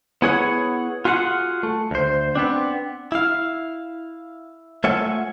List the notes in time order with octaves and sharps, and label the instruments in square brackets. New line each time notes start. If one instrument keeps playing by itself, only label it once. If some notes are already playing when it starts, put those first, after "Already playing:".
[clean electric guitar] B3 E4 G#4 C#5 D#5 F#5
F4 F#4 G#4 F5 F#5
A3
D2 C5
B3 C4 D4
E4 F5
A3 F4 C#5 E5 F#5 G#5